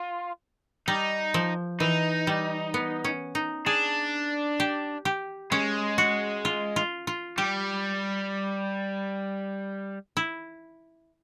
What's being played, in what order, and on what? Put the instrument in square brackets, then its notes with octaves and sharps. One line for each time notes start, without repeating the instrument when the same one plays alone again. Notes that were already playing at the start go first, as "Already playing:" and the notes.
Already playing: [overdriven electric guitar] F4
[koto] G3 [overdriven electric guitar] D#4
[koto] F3
[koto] E3 [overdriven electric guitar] D#4
[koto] G3
B3
C#4
D#4
[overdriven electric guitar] D4 [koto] G#4
[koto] G4
G4
[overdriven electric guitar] G#3 [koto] C#4
[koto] F#4
F4
F4
F4
[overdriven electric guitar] G3 [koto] G4
[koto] E4